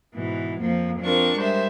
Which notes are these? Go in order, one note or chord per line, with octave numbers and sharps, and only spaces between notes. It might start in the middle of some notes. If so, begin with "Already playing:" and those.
G#2 B2 E3
F2 F3 A#3
F3 C4 D4 F4 A#4 C#6
G3 G#3 A#4 C5 E5